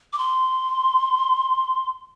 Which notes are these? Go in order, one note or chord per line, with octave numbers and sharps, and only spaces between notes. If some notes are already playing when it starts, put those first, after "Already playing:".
D6
C6